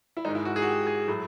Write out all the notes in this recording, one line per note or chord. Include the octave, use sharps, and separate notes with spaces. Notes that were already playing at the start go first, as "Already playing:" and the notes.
E4
G#2 D#3 G#3 D#4
E4
F#4
G#4
F#4
G4
G#4
A2 F#3 A3